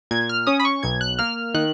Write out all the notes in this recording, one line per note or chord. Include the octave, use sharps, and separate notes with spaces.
A#2 G#6
F6
C#4 D#6
B5
C#6
B1 G#6
F#6
A#3 F6
D#3 F#6